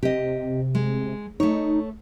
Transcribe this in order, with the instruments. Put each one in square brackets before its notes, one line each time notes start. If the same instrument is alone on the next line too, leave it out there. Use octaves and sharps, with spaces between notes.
[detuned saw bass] C3 [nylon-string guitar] G4 D#5
[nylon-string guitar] G#3
[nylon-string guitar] A3 C#5 [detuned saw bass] D#4